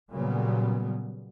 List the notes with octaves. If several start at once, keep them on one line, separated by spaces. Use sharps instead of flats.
A#2 C#3 F#3 G3 B3